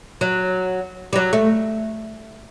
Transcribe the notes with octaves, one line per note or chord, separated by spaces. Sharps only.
F#3
G3
F#3
A3